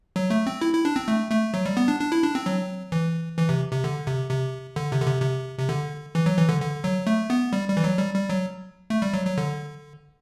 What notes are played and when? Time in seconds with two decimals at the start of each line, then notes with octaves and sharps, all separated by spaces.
0.16 F#3
0.30 A3
0.47 C4
0.61 E4
0.73 E4
0.85 D4
0.96 C4
1.08 A3
1.31 A3
1.54 F#3
1.66 G3
1.77 B3
1.88 D4
2.00 D4
2.12 E4
2.24 D4
2.35 C4
2.46 F#3
2.92 E3
3.39 E3
3.49 C3
3.72 C3
3.84 D3
4.07 C3
4.30 C3
4.76 D3
4.92 C3
5.02 D3
5.07 C3
5.22 C3
5.59 C3
5.69 D3
6.15 E3
6.26 F#3
6.37 E3
6.49 D3
6.61 D3
6.84 F#3
7.07 A3
7.30 B3
7.53 G3
7.68 G3
7.77 E3
7.84 F#3
7.98 G3
8.14 G3
8.29 F#3
8.90 A3
9.02 G3
9.13 F#3
9.26 F#3
9.38 D3